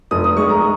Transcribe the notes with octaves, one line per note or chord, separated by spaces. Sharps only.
F1 D#6
D#6
G#3 C#6
A#5